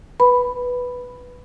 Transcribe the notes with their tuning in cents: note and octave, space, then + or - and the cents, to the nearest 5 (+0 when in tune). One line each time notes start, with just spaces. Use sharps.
B4 +0 B5 +0